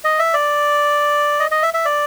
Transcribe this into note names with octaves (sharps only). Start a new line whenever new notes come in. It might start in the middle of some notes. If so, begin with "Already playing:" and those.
D#5
E5
D5
D#5
D#5
E5
E5
D5